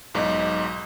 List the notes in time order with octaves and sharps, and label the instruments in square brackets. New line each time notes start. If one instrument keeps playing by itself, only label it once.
[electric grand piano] B1 G#2 [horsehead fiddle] D#5